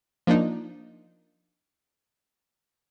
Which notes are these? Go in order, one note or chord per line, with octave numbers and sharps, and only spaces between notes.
F3 A#3 D4 D#4